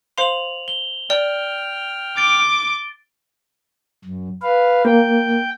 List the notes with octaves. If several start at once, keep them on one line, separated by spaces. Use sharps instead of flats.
C5 F5 C6 F7 F#7
G7
D5 G5 F6
D6 A6 D7 G7
F#2
B4 F5
A#3 G5